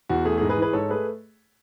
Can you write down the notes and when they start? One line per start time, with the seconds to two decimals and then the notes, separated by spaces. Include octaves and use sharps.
0.09 E2 F#4
0.25 A3 G#4
0.38 G#4
0.41 G#2
0.49 G#4 B4
0.57 E3
0.62 G#4 B4
0.73 G#2 A4 C#5
0.89 A3 G#4 B4